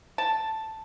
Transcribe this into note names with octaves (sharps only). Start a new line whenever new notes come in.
A5